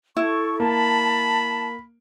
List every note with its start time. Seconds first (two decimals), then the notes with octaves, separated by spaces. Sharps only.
0.17 E4 A4 C#6
0.60 A#3 A5 B5